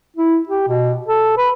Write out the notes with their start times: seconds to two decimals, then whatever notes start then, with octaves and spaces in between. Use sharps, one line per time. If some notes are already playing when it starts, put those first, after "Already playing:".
0.16 E4
0.48 G4
0.67 B2
1.08 A4
1.38 B4